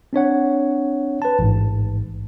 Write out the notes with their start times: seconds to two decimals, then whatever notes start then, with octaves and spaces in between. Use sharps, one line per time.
0.13 C4 D4 C#5 F#5
1.22 B4 A5
1.39 A1 G#2